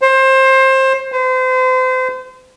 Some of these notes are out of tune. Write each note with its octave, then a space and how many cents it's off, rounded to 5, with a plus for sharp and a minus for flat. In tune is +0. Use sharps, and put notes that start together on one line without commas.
C5 +25
C5 -35